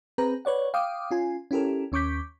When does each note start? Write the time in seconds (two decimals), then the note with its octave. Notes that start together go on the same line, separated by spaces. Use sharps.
0.18 C4 G#4 B4 A#5
0.45 B4 C#5 D5 F#5
0.74 F5 G5 D6 D#6
1.11 C#4 F4 G#5
1.51 C#4 E4 G4 A4 A#4
1.92 D#2 C#4 C#6 D6 G6 B6